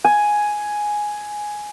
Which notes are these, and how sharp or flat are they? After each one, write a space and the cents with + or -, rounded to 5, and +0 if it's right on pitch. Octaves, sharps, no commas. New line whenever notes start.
G#5 +5